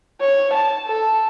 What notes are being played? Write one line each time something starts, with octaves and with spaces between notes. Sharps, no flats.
C#5
A5
A4